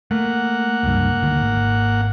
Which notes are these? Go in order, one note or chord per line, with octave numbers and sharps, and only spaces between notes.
A3 A#3 F#5
F1 C#2 G2
D#1 D2 D#3
G#1